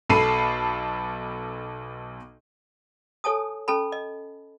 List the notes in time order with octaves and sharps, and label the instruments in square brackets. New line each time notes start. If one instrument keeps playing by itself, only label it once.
[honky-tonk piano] B1 A4 A5 B5 C7 D#7
[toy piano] A4 C#5 G#5 A5 D#6
C#4 A4 A5 B5
D#5